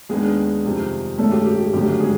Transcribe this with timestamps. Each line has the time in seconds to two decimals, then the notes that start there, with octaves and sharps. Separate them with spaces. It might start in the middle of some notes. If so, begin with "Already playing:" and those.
0.09 D#2 D#3 G#3 B3 D4 G#4
0.64 F2 C3 D#3 G3
1.18 G2 D#3 G#3 A3 C#4 A4
1.32 G4
1.46 G4
1.60 G4
1.73 G#1 F#2 D3 F#3 A3 G4
2.00 G#3 G#4